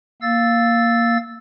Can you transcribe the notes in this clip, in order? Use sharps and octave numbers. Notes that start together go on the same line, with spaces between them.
A#3 F5 E6 A6